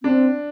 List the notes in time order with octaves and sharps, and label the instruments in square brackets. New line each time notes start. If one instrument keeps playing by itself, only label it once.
[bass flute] C4 [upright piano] D4